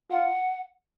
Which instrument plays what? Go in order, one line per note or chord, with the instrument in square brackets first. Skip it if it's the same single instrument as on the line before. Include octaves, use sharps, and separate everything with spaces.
[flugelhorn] F4 [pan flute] F#5